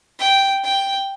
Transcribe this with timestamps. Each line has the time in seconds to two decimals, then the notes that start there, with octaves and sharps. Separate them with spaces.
0.19 G5
0.64 G5